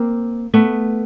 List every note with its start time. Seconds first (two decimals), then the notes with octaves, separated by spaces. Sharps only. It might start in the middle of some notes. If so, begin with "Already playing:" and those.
Already playing: A#3 C4
0.54 A3 B3